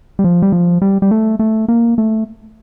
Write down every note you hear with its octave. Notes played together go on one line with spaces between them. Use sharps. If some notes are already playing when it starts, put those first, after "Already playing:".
G3
F3
G3
F3
G3
G3
A3
A3
A#3
A3